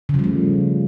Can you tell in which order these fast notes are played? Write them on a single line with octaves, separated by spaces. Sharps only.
C#3 F3 G3 A3